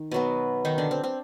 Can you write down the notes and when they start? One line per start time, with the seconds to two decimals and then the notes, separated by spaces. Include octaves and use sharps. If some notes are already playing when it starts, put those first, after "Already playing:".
Already playing: D#3
0.11 B2 F#3 B3
0.65 D#3 D#4
0.78 D3 D4
0.91 C4
1.04 C4